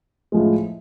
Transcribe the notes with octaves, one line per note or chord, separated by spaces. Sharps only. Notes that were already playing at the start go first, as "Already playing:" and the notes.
A2 F3 G#3